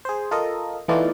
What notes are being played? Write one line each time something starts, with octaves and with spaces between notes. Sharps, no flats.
G#4 C5
F4 A4 A#4 D#5
E3 A3 B3 D#4 F4 D5